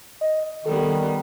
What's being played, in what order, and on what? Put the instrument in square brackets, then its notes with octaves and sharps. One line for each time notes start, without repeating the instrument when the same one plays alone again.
[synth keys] D#5
[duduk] D#3 [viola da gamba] G3 B3 [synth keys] A4